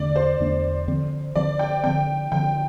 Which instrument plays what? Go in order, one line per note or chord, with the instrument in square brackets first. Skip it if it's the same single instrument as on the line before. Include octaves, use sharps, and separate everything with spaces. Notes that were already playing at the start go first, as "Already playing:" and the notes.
Already playing: [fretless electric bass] E2 D3 A3 D4 [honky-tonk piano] D5
[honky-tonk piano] C5
[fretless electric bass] E2 D3 A3 D4
D3 F3 C4
[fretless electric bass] D3 F3 C4 [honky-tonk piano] D5
[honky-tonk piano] G5
[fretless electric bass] D3 F3 C4 [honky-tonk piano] G5
[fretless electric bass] D3 F3 C4 [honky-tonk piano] G5